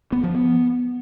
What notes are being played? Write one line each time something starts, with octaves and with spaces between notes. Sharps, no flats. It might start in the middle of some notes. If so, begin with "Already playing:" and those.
B3
F3
B3